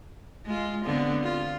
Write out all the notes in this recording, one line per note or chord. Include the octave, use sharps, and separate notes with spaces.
G#3 F4
D3 B3 C4
F4